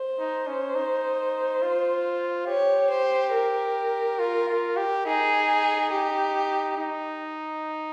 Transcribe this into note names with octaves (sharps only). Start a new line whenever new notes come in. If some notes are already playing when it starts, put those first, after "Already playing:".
Already playing: C5
D#4
C#4
D#4
F4
G4 C#5
C5
A#4
F4
F4
G4
D#4 G#4
G4
D#4